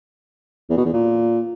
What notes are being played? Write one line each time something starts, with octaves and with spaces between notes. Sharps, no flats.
E2
B2
E2
A#2